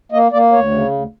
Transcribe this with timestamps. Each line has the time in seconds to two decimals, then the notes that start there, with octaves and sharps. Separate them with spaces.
0.12 A#3 D#5
0.32 A#3 D5
0.52 D2 C#5
0.71 C#3
0.91 D2